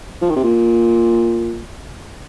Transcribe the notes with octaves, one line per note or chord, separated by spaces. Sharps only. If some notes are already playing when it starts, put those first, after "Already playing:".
F3
D#3
C3
A#2